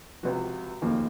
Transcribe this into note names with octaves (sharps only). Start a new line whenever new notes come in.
C#2 C3 F3 F#4
F1 D#2 C#3 F3 A#3